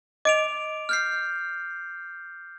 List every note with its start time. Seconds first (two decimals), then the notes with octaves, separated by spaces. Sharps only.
0.25 D#5 D6 D7 F7
0.89 F6 G6 C7